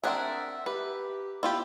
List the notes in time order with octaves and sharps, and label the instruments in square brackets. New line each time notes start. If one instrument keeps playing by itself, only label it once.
[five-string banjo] C4 D4 G#4 [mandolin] A#4 F#5 [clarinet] E5
[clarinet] G4 [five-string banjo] B4
[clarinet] B3 [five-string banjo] E4 F4 G4